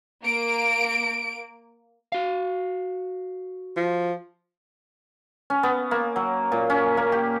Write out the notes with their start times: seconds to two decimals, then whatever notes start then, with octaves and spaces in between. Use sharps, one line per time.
0.23 A#3 D7
2.12 F#4 F5
3.77 F3
5.50 C#4
5.63 B3
5.91 A#3
6.16 F#3
6.52 A#2
6.70 C#4
6.97 A#3
7.12 G4